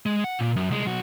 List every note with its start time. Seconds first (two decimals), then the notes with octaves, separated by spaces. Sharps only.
0.06 G#3
0.24 F#5
0.39 A#2
0.56 F#2
0.71 C2 G#3
0.85 B1 F#4